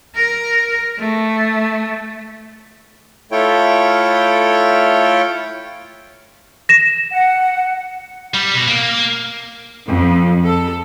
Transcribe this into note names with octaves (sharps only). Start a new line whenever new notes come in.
A#4
A3
A3 E4 F4 A4 C#5 G5
A#6 E7
F#5
G3
B2
A#3
F2
A4